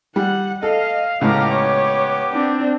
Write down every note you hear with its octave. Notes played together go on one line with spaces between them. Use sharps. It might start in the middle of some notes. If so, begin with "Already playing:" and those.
G3 F#5
A4 D#5 F5
C#2 A2 B3 G4 F5 A#5 D6
C#5
C4 D4